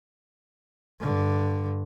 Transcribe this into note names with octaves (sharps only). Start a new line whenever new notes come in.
G2 D3